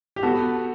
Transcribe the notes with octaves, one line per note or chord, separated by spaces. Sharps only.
G4
B3 F#4 A4